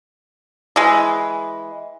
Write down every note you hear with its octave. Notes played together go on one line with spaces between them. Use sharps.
E3 G#3